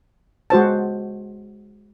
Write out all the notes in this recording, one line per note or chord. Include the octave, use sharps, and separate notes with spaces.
G#3 F#4 C5 A5